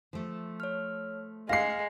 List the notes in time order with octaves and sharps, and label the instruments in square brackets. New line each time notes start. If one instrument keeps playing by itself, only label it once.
[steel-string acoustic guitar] F3 A3
[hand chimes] C#5 F6
[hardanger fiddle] G#3 [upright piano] F5 C7 [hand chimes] A#6 C#7